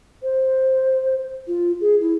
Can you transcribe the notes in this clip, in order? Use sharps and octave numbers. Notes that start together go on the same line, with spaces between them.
C5
F4
G#4
E4